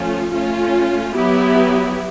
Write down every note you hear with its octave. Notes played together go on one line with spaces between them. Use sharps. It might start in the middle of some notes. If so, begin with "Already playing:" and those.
Already playing: F3 A3 C#4 F4
A3 C#4 F4
F#3 B3 E4 G4